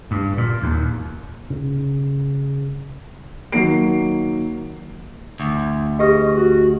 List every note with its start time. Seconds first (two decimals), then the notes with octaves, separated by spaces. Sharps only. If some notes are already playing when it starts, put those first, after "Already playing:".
0.11 G2
0.38 A#2
0.62 D#2
1.50 C#3
3.52 D#3 F#3 A#3 C7 D7
5.40 D2
5.99 G4 G#4 B4 D#5
6.36 F#4